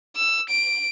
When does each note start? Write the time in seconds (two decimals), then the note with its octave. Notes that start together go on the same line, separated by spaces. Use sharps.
0.16 E6
0.49 D7